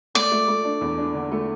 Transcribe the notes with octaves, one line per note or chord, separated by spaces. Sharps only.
A3 D5
A3
A3
D4
E2
D4
D3
A3